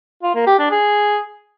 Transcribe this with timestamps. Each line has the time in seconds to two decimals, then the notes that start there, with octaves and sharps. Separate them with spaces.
0.23 F4
0.35 A#3
0.47 G4
0.59 D4
0.71 G#4